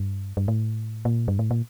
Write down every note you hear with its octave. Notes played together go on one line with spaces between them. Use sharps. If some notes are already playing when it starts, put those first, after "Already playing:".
Already playing: G2
G2
A2
A#2
G2
A2
A#2